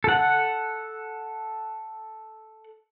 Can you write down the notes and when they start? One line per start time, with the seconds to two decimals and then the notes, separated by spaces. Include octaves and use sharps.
0.04 A4 F#5